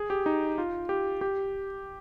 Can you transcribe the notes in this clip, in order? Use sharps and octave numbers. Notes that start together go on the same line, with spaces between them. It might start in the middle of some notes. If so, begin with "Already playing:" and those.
Already playing: G#4
G4
D#4
F4
G4
G4